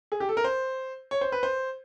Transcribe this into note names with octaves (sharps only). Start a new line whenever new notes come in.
G#4
G4
A4
A#4
C5
C#5
C5
B4
C5